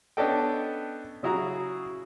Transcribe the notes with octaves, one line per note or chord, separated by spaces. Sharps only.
B3 C#4 D4 A4 D#5 G5
C#3 F#3 E4 F#4 G#4 A#5